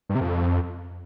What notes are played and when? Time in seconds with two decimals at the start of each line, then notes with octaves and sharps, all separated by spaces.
0.09 G2
0.15 C3
0.21 F2